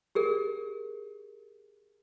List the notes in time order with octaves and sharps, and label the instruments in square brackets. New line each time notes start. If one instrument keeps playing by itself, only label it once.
[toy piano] G4 G#4 A#4